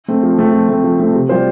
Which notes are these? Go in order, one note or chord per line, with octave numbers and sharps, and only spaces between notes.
A3 C4
F3
A3 C4
F3
A3 C4
F3
A3 C4
C3
G3 F4 C5